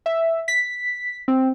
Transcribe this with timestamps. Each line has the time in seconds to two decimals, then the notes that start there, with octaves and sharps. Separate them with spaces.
0.06 E5
0.48 B6
1.28 C4